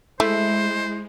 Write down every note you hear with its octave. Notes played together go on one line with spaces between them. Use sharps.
G#3 A3 E4 C5